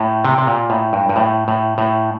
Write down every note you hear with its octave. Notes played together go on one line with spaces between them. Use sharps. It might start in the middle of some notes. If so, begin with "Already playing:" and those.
Already playing: A2
C3
C3
A#2
A2
G2
G2
A2
A2
A2